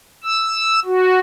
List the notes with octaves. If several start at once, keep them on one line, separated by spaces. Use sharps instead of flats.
E6
F#4